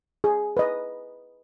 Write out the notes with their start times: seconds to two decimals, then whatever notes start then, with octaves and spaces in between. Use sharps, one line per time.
0.24 G#4
0.57 B4 D#5